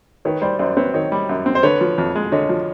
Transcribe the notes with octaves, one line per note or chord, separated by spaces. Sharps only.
D#3 B4 C#5
G3 C5 D5
F#2 C5 D5
C4 B4 C#5
D#3 C#5 D#5
G3
F#2
C4
C5
D3 B4 C#5
F3
F2
G#3
D3 C#5 D#5
F3